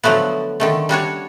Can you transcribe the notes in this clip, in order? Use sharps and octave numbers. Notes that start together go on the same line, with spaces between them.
D3 F3 F#3 A3 B3
D3 D#3 A3
G3 D4 F#4 C#5